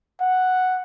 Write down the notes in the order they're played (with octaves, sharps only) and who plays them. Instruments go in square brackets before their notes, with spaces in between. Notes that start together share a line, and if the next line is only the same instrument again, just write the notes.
[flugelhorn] F#5